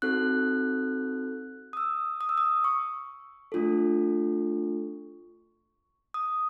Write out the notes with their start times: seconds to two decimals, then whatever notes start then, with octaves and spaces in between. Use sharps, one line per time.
0.02 C4 D#4 F#4 A4 F#6
1.73 D#6
1.77 E6
2.21 D#6
2.29 E6
2.38 D#6
2.64 C#6
3.52 A3 D4 F4 A4
6.14 D#6